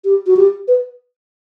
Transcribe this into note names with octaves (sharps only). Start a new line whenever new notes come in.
G4
F#4
G4
B4